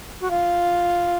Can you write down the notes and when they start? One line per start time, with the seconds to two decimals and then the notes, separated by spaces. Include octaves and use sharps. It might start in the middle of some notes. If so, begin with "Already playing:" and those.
0.21 F#4
0.31 F4